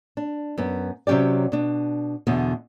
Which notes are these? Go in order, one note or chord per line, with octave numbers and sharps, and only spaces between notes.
D4
F#2 B3
C3 F#3 C#4 G4 D5
B2 D4
E2 B2 D3